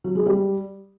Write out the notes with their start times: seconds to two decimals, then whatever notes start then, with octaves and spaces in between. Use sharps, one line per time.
0.04 F#3
0.15 G#3
0.26 G3